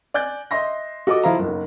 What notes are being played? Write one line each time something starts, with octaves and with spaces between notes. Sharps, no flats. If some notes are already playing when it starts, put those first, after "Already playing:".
D5 G#5 F#6 G6
D#5 E5 C6 A#6
F#4 A4 D#5 D6
F3 E4 C5 F5 A#5
F#1 B1